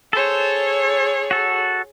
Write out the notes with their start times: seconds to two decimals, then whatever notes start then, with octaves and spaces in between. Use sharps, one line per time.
0.13 G#4 A4 C5 C#5
1.31 F#4 A4